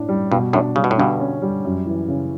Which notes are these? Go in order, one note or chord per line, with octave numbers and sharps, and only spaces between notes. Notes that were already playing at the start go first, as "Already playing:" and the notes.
Already playing: A2 D4
G3
G2 B2
F#2 A2 D4
C#3 G3
B2
A2
G2 B2 D3
C#4
G3
F#2
E3
C#3